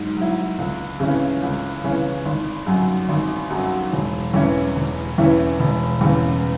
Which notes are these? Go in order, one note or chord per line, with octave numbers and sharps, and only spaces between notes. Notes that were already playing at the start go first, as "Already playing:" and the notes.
Already playing: G#2 F#3
F#3 E4
C#2
C#3 E3 C#4 E4
C#2
C#3 E3 C#4 E4
G#1
F#2 F#3
G#1
F#2 F#3
E1
E2 E3 C#4 E4
E1
E2 E3 C#4 E4
E1
E2 C#3